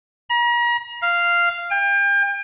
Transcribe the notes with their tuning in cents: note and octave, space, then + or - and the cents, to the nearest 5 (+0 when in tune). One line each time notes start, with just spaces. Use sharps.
A#5 +40
F5 -10
G5 +35